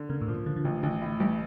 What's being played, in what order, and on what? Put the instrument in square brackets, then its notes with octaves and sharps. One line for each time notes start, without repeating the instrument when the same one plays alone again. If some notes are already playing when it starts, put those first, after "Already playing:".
Already playing: [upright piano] D3
[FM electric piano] C#3 [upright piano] A#3
[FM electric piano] A2
[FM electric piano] A#2 [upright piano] F3
[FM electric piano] D3 [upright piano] F3
[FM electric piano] D3
[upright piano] A1 [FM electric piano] C#3
[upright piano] A1 [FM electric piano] D3
[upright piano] A2
[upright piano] A1 [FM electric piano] G3